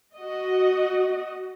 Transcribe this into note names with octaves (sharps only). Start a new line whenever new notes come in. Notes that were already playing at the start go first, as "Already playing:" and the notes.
F#4 D#5